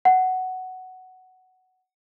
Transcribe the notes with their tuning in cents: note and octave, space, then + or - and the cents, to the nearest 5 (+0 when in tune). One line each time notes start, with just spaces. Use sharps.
F#5 +10